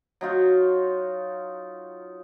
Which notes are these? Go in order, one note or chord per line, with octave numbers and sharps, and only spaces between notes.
F#3 D#4 F4 F#4